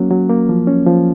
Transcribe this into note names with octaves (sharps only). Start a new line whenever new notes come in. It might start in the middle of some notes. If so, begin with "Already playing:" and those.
Already playing: F#3 A#3 C#4
F#3
A#3
F3
C#4
F3